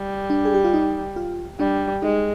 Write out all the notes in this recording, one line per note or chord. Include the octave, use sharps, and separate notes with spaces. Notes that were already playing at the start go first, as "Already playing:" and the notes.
Already playing: G3
D4
G#4
G4
F4
D#4
F4
G3 D4
G#3 D#4